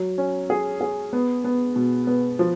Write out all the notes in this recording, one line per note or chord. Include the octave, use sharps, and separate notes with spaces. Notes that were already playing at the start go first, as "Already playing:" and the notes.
Already playing: F#3
C#4
G#4
G#4
B3
B3
B2
B3
F3